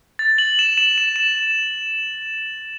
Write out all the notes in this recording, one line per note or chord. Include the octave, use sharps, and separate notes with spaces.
A6
F#7
E7
E7
E7
E7